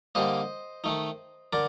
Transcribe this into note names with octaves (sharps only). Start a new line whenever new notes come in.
D3 G3 A#3 C5 D#5
D#3 A3 D#4
D3 A#4 D5